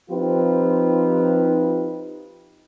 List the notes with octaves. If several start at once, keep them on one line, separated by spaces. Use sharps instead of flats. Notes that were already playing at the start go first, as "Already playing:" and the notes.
F3 C4 D#4 F4 G4 B4